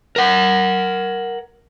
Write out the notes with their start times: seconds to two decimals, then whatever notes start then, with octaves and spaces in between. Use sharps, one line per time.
0.16 A#4 F#5